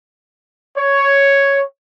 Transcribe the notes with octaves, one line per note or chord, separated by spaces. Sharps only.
C#5